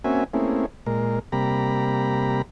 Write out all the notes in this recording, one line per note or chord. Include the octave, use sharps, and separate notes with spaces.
A#3 C4 C#4 F#4 E5 G#5
A3 A#3 C4 C#4 E4 G#4
A#2 G#3 A#4
C3 G3 A#3 G4 A#5 B5